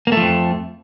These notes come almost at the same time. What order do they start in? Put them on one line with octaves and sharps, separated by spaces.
A#3 A3 F3 F2